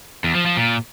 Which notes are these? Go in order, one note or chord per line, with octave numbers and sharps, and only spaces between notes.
E2
F3
F3
A#2